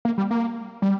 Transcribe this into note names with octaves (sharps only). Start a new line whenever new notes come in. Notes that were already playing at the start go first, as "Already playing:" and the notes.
A#3
G3
A#3
G3